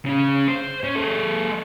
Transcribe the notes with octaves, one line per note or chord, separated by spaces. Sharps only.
C#3 C#4
C5
C#4
G#3 A4